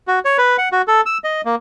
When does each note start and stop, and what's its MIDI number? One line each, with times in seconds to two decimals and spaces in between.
0.08 0.19 66
0.25 0.37 73
0.38 0.57 71
0.58 0.69 78
0.72 0.82 66
0.88 1.01 69
1.06 1.18 88
1.24 1.41 75
1.45 1.55 58